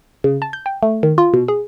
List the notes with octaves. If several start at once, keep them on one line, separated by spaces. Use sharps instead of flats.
C#3
A5
G6
G5
A3
D#3
F4
B2
G#4